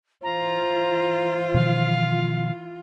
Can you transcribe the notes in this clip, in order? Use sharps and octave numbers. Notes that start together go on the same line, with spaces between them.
E3 F4 C5 A#5
B2 D#3 F3 F5